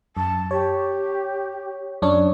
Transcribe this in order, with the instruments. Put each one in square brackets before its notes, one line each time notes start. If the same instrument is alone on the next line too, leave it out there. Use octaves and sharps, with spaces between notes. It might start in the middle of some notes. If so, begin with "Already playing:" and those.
[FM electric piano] F#2 [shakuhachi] A5
[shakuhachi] G4 [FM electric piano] C#5
[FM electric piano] F#2 D4 C#5